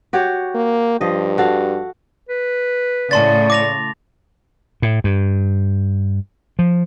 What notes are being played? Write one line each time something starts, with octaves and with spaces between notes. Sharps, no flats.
F#4 G4 C#5
A#3
G2 F3 D#5
F#4 A4 F5
B4
A2 C#3 D5 A5 C6 A6
D6 A#6 F7
A2
G2
F3